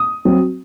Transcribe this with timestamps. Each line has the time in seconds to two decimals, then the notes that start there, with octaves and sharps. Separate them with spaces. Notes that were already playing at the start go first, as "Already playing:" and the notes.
Already playing: D#6
0.25 F#3 C4